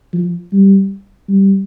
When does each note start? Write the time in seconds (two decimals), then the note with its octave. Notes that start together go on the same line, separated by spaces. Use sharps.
0.13 F3
0.53 G3
1.28 G3